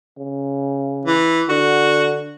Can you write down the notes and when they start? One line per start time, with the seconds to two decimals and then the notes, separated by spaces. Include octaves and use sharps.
0.18 C#3
1.05 E3
1.49 D3 F#4